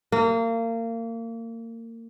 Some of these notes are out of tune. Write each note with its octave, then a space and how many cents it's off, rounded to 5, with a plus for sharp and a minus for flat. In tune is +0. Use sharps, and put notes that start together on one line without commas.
A#3 -30